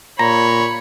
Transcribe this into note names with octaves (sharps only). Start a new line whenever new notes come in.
A#2 C#5 A#5 B5